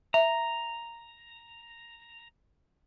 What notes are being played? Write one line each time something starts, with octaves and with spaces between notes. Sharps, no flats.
E5 A#5